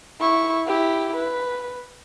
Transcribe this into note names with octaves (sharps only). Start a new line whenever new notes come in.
E4 C#6
E4 G4
B4